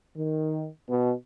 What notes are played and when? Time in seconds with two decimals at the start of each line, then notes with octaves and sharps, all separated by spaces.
0.17 D#3
0.88 B2